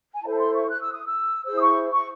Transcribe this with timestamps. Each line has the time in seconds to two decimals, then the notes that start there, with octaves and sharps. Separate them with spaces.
0.14 G#5
0.22 E4 A4 C5 A5
0.33 A5
0.38 C6
0.53 C#6
0.69 F#6
0.81 E6
0.93 D#6
1.06 E6
1.45 E4 G#4 C5 E6
1.56 D#6
1.61 C#6
1.92 C#6